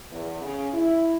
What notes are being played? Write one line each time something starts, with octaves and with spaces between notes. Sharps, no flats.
E2
C#3
E4